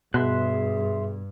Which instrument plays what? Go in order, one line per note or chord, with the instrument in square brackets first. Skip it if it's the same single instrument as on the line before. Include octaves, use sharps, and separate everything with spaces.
[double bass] G2 [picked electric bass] B2 [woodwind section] G#4 [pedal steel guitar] E5 C6 F#6